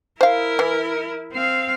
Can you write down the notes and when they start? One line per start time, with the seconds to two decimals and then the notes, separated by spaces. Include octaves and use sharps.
0.21 E4 A#4 C5 F5
0.59 E3
1.33 C4 F5